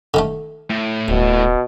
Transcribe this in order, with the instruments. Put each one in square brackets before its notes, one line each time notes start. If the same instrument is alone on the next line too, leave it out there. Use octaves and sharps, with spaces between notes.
[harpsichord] D3 D#3 A3
[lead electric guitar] A2
[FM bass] D1 [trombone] B2